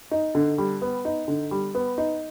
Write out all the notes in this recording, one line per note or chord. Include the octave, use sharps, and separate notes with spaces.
D#4
D3
G3
B3
D#4
D3
G3
B3
D#4